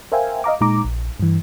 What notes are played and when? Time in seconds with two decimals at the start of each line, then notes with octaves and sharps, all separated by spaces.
0.12 A#4 C5 E5 F5 G5 G#5
0.44 D#5 F5 A#5 D6
0.61 A#2 G#3 D#4 A#5 D6
0.85 A#1
1.20 G2 E3